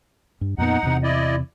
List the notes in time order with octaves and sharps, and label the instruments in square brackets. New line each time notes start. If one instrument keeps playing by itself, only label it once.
[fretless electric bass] G2
[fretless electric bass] F2 A#2 B3 [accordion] D#4 F#5
[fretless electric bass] E2 C3
[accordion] E4 D5 D#5